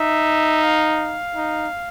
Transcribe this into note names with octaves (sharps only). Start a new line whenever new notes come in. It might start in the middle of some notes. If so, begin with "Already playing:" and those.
Already playing: D#4 E5
F5
D#4